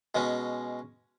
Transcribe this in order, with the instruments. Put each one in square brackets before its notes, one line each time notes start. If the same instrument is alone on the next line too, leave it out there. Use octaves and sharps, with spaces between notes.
[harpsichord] B2 G#3 C#4